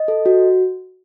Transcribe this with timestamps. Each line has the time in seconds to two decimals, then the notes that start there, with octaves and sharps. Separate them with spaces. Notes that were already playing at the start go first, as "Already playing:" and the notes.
Already playing: D#5
0.08 A4
0.26 F#4